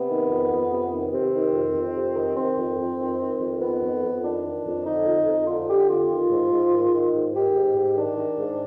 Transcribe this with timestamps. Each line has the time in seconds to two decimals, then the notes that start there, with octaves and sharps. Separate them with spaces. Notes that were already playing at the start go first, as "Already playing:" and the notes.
Already playing: C3 B3
0.09 D#3
0.30 F2
0.50 F2
0.71 C3
0.92 D#3
1.12 C3 C4
1.33 D#3
1.54 F2
1.74 F2
1.95 C3
2.16 D#3
2.37 D#3 C4
2.57 F2
2.78 F2
2.99 D#3
3.20 D#3
3.40 F2
3.61 D#3 B3
3.82 F2
4.03 F2
4.23 D#3 D4
4.44 D#3
4.65 F2
4.85 D3 D#4
5.06 F2
5.27 F2
5.47 D3 F4
5.68 D3 G4
5.89 F2 F4
6.09 D#3
6.30 G#2
6.51 G#2
6.72 D#3
6.92 D#3
7.13 G#2
7.34 D#3 G4
7.55 G#2
7.75 G#2
7.96 D#3 D4
8.17 D#3
8.37 G#2